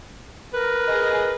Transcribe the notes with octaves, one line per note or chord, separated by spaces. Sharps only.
A#4 B4
G#4 D#5